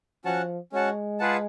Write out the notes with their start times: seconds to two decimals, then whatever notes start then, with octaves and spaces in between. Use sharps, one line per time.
0.25 F3 C#4 F#4 C#5 F#5 A5
0.72 G#3 C#4 F#4 C#5 F#5 A5
1.20 F4 G#4 B4 F#5 A5